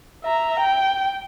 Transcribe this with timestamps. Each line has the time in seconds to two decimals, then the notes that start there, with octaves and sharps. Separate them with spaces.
0.25 E5 A#5
0.60 G5